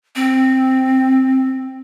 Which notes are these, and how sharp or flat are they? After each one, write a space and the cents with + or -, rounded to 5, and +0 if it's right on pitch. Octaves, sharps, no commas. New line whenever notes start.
C4 +5